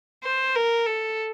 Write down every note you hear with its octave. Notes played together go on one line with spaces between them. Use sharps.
C5
A#4
A4